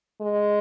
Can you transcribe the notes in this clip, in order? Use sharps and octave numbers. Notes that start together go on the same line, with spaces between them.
G#3